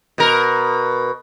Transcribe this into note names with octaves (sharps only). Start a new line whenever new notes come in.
B2 A#4